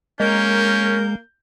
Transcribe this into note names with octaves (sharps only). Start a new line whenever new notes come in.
G#3 A#3 C#4 A#4 G6